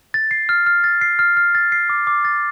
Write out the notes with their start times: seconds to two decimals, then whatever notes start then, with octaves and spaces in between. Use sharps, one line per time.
0.14 A6
0.31 C7
0.49 F6
0.66 F6
0.84 A6
1.01 C7
1.19 F6
1.37 F6
1.55 A6
1.72 C7
1.89 D6
2.07 D6
2.25 A6